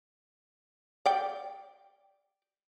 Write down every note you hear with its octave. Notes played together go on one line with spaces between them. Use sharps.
D5 G5